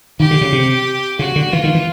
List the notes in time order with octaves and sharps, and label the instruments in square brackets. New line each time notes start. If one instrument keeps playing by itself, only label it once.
[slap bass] D#3 [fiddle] G4
[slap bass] D3
C#3
C3
[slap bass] C#3 [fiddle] F#4
[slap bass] D3
[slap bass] E3 [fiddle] F4
[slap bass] D#3
E3